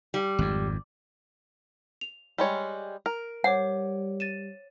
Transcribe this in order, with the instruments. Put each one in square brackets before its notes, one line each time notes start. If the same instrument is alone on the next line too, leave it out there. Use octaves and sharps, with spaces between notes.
[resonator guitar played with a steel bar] G3
[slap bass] G#1 F2
[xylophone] F7
[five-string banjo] G3 G#3 C#5
A#4
[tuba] G3 [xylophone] C5 C#5 D6 [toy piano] F#5
[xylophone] A6 D#7 E7